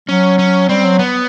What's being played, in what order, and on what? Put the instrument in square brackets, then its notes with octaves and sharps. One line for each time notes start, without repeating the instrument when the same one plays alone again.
[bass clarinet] F#3 [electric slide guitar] C#4
[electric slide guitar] C#4
[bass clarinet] G3 [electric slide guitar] C4
[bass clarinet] F#3
[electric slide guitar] B3